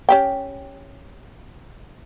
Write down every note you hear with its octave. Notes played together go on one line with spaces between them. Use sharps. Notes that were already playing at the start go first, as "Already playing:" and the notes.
C#4 G4 G5